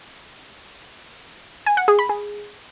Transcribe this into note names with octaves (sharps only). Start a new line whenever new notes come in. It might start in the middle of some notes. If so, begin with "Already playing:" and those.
G#5
F#5
G#4
B5
G#4